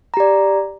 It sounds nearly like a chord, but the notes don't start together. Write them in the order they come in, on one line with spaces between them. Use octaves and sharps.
A#5 G4 D5